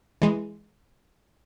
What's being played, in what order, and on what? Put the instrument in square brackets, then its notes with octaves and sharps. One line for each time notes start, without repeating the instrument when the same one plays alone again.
[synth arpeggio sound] E3 G#3